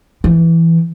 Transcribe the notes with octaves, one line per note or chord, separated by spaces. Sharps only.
E3